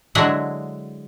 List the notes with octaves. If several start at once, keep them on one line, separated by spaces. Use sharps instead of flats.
D3 F#3 G#3 E4 G#4